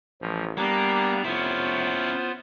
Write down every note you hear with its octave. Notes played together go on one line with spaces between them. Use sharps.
A1 F3
G3 A#3 B3 D4 A#5
F1 B3 C#4 E4 F4 C5